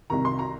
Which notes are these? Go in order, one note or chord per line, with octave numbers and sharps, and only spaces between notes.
C2 C3 D#3 A#5
C6
A#5